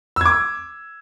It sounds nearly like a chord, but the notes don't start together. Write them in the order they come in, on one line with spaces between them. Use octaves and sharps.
E6 G#6 D6